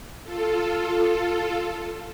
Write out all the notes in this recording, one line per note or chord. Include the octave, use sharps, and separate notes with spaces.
F4 A4